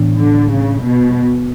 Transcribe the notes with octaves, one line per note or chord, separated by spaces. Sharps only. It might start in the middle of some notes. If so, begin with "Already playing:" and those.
Already playing: A2 E3 B3 D4
D3
C#3
B2